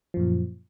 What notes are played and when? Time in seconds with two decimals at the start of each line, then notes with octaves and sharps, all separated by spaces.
0.14 F3
0.17 F#2
0.19 A#2